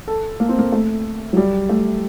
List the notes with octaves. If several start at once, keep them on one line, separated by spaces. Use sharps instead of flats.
A4
A#3
C4
A#3
A3
F#3
G3
A3